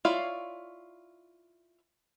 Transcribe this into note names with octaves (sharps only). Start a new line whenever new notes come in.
E4 F4 C#5 D5 F5